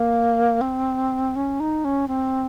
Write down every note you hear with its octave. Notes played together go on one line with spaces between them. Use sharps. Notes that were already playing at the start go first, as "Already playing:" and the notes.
Already playing: A#3
C4
C#4
D#4
C#4
C4